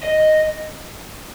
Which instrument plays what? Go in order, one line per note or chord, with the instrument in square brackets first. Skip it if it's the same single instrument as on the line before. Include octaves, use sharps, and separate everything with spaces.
[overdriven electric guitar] D#5